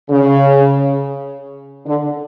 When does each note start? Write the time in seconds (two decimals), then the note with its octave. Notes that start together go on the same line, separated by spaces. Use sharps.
0.10 C#3
1.86 D3